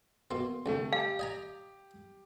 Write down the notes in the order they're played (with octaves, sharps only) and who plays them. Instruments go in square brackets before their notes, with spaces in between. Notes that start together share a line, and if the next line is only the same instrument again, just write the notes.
[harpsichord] B2 A#3 [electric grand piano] C6
[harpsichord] C2 F2 [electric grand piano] D3 A3
[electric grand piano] G4 [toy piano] F5
[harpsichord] D#5 G#5 A#5